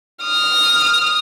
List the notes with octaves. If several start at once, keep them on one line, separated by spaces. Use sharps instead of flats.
D#6 F6